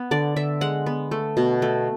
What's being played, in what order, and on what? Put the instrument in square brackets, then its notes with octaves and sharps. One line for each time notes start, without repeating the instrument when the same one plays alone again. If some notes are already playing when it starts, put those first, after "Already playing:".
Already playing: [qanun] B3
D3 D5
D3 E5
G#3 F#5
B3
A3
B2
A3